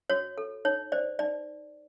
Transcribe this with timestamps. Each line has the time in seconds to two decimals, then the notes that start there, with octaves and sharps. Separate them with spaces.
0.10 F#4 C#5
0.38 A4
0.65 D#4 C#5
0.92 C5 D5
1.19 D#4 D5